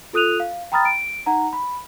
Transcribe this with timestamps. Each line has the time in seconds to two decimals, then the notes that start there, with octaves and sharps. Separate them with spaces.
0.13 F4 A4 D#6 F#6 D#7 F7
0.40 F5
0.72 G5 A#5 B5 D#6 F6 A6
0.85 D7
1.26 D#4 F#5 A#5
1.53 B5